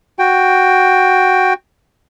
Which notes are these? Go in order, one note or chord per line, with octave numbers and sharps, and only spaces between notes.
F#4 G5